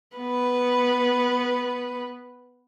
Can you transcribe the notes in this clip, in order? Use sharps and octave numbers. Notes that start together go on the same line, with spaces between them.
B3 B4